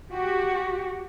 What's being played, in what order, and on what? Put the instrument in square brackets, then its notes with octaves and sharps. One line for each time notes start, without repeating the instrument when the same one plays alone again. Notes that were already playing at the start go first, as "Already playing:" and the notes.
[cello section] F#4 G4